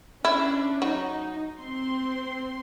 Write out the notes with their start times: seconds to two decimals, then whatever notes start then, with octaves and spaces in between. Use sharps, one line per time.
0.25 C#4 D4 E4
0.82 F#3 D#4
1.60 C4 C6